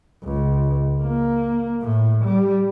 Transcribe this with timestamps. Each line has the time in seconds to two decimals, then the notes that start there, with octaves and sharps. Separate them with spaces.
0.24 C#2
1.02 A#3
1.82 A2
2.24 G3